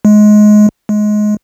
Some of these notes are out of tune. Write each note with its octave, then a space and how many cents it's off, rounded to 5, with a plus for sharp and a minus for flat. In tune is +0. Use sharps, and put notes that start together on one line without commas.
G#3 +20
G#3 +20